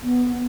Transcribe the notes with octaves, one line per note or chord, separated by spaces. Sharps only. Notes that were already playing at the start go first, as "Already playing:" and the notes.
B3